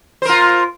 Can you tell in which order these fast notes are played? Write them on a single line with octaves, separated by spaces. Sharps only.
C5 A#4 F4